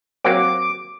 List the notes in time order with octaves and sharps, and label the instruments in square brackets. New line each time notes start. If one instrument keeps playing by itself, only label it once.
[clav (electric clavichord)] F#3 A#3 C4 [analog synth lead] D6